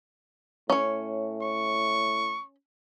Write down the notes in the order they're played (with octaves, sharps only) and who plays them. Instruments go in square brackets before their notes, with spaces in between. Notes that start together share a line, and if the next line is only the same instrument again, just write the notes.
[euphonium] A2 [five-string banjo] C#4 C#5
[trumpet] C#6